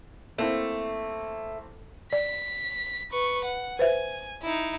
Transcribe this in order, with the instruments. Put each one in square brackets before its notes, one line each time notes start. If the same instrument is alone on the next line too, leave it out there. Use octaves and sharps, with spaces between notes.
[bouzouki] A3 [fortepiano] A#3 C4 E4
[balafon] D5 [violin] B6
[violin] B4 C#6
F#5
[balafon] B4 C5 E5 [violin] G#5
[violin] D#4 E4